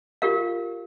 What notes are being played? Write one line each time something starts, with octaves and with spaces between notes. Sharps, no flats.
F4 G4 A#4 F5